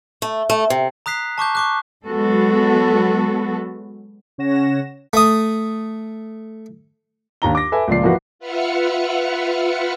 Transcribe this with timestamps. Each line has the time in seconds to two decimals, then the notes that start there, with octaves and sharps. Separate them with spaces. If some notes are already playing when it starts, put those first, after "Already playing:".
0.22 A3
0.50 A3
0.70 C3
1.06 A#5 D#6 F#6 B6 C7
1.38 A5 C#6 D6 G6
1.55 C#6 D6 F#6
2.07 F#3 G#3 B3 F#4 A4
4.38 C#3 C#4 C#5 F#5 A#6 E7
5.13 A3 D#6
7.42 D#2 D4 A#5 G7
7.55 D6 A#6
7.72 A4 B4 E5 G#5
7.88 C#2 A#2 F3 D5 C7
8.03 E3 F3 A#3 F#4 B4
8.39 F4 B4 E5 F#5 F6 C#7